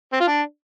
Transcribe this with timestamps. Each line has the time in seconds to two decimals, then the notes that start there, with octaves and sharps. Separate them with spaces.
0.13 C4
0.20 F4
0.28 D4